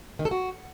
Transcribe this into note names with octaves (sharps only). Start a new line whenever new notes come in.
D#3
A4
F#4